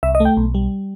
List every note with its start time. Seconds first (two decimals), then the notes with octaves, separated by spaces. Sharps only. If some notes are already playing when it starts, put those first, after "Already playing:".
0.03 C2 E5
0.15 D#5
0.20 A3
0.25 G5
0.37 B1
0.54 G3